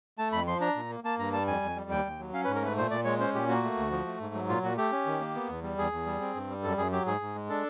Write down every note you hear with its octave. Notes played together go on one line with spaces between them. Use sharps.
A3 A5
F2 B5
F3 C6
D4 A#5
A#2
A#3
A#3 A5
G2 A#5
G3 A5
F2 G#5
F2
G3
D#2 G5
D#2
F#3
C#4 F5
B4
G#2
A#4
A3 B4
A#2 C5
A#2 D5
G#3 C#5
C#4 C5
A#2 G4
A#3 F#4
A3
D2
F3
A3
G#2
F#3
A#2 F4
A#2 F#4
A3 G4
C#4
D#3
A#3
B3
E2
G3
E2 G#4
E2
G3
C4
G2
G3
F#2 A4
F#2 G#4
F#3 G4
G#2 G#4
G#2
G#3
D4 A4